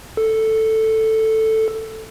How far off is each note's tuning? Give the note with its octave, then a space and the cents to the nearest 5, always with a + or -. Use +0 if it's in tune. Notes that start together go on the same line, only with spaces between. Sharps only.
A4 +5